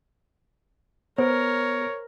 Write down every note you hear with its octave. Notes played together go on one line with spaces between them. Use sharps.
B3 A#4 C5 C#5